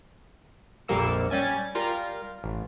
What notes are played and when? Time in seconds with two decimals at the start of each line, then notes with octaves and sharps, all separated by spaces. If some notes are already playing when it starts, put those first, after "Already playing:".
0.88 A#1 F2 G3 A#3 E6 C#7
1.30 G3 C#4 G#5 A6
1.75 G3 F4 A#4
2.44 A1